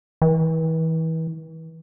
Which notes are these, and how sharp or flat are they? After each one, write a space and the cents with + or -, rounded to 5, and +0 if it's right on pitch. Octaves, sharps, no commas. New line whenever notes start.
E3 -35